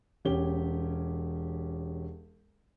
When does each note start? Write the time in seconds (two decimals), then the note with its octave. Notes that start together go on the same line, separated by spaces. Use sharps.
0.25 E1 C#4 G4 G7